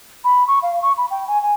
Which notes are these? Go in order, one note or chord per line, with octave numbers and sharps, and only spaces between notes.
B5
C#6
F5
C#6
B5
G5
G#5
G#5